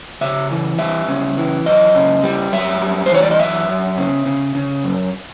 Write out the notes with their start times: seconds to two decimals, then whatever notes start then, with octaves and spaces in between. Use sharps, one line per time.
0.21 C#3 E5
0.50 E3
0.79 G3 E5
1.08 C#3
1.37 E3
1.66 F#2 D#5
1.95 C#3
2.24 G3
2.53 F#2 E5
2.81 G3
3.06 C5
3.11 E3 C#5
3.22 D5
3.31 D#5
3.39 F#2 E5
3.68 F#2
3.98 C#3
4.26 C#3
4.55 C#3
4.84 F#2